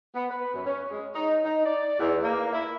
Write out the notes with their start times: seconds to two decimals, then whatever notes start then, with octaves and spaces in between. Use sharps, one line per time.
0.15 B3
0.29 B4
0.54 F#2
0.66 C#4
0.90 G#3
1.15 D#4
1.44 D#4
1.65 D5
2.00 E2
2.22 A#3
2.53 E4